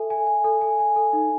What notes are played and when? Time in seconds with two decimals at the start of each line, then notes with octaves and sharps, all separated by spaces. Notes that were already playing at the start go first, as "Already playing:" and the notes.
Already playing: A4 E5 G#5
0.10 G#5
0.27 G#5
0.44 A4
0.62 G#5
0.79 G#5
0.96 A4
1.13 D#4